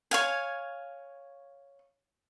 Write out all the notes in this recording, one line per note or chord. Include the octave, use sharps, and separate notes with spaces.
C#5 F5 G#5